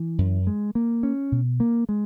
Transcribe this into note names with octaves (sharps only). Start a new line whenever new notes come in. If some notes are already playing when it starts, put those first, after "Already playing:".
Already playing: E3
F#2
G#3
A#3
C#4
B2
A#3
G#3